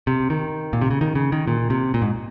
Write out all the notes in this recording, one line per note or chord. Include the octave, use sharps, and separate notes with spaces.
C3
D#3
A#2
C3
C#3
D#3
C#3
D#3
A#2
C3
A#2
G#2